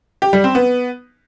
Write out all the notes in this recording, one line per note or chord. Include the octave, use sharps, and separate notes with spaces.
G4
G3
C4
B3